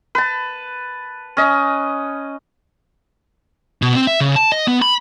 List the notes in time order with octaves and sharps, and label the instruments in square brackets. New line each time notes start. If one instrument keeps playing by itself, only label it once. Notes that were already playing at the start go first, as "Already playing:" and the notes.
[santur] B4 A5
C#4 D#5
[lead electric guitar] B2
C4
E5
C#3
A5
D#5
B3
B5